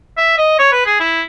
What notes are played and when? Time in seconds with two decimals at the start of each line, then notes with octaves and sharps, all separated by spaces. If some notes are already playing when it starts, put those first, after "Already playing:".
0.18 E5
0.38 D#5
0.59 C#5
0.72 B4
0.86 G#4
1.00 E4